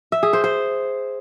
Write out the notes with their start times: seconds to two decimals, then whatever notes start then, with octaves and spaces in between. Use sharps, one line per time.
0.12 E5
0.23 G#4
0.33 C5
0.44 C5